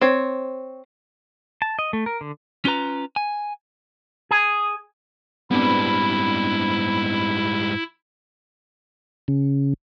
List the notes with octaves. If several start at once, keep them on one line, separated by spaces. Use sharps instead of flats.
C4 C#5
A5
D#5
A3
A#4
D3
C#4 F4 B4 A#5
G#5
G#4
G#2 G3 B3 C4 D4 E4 B5
C#3